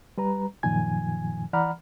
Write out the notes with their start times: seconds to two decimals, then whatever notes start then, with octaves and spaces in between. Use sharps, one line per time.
0.18 G3 B4 A#5
0.63 F#2 A#2 D#3 F3 G#5 G#6
1.53 E3 D5 F#5 A#5 B5 F6